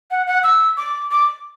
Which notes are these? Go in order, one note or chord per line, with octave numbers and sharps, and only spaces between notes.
F#5
F#5
E6
D6
D6